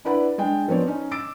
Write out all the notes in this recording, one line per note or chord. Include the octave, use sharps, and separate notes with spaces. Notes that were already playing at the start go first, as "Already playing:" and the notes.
D4 E4 B4 D5 F#5 B5
G#3 D4 G5
F3 B3 C4 C#5 D5
C#4 D#4
D6 E6 A6 D7